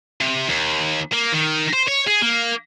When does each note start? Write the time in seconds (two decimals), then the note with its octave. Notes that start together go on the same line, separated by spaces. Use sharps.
0.20 C3
0.49 D#2
1.13 A#3
1.32 D#3
1.73 C5
1.88 C#5
2.07 G#4
2.22 A#3